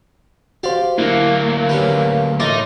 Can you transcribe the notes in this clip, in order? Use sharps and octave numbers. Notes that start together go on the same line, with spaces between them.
F#4 G4 C5 D5 F5
D2 F#3 A#3 D4 E4
C#4 G4 B4
A2 D#4 A#4 C6 D6 A6 A#6